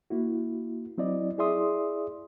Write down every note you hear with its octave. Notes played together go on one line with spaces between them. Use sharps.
A#3 E4 F#4
F#3 C4 E4 D5 D#5
E4 G#4 D5 E5 C6 D#6